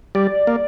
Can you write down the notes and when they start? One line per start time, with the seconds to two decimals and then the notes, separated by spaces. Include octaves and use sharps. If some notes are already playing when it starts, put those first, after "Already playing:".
0.15 G3 D5
0.47 A#3